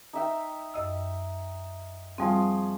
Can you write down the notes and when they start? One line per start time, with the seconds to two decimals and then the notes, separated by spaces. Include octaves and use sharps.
0.13 D#4 E5 G5
0.74 F#2 D#5 E6
2.18 F3 G3 C4 G#4 C#6